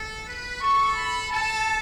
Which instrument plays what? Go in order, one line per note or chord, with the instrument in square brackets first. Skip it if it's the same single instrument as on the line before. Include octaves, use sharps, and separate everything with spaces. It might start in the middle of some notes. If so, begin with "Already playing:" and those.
Already playing: [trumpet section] A4
B4
[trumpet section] A4 [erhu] C#6
[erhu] B5
[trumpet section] A4 [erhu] A5